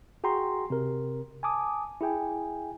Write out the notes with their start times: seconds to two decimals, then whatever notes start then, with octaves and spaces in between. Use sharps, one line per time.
0.24 F#4 G#4 G5 A#5 C6
0.70 C3 A#4
1.43 G#5 A5 D6 D#6
2.01 E4 G#4 G5 G#5